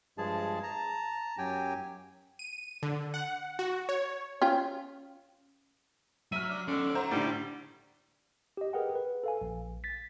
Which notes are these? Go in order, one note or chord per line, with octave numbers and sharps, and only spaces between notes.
G2 F3 G#3 G#4 A5
A5 A#5
F#2 F#3 G4 G5 G#5
D#7
D3
F#5
F#4
C#5
C#4 F4 G5
F#3 E5 F6 D#7
D4
D3 C#4 D5
C5 C#5 F#5 A#5
A2 D3 G3
G4 D#5
G#4 A#4 B4 F#5 G5
B4
A4 F5 G#5
A#1
A6 B6